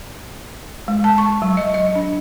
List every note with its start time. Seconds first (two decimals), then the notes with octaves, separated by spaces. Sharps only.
0.88 G#3
1.04 A5
1.18 C#6
1.42 F#3
1.57 D#5
1.74 D#5
1.95 D4